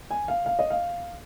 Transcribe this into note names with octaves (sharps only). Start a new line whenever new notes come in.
G#5
F5
F5
D#5
F5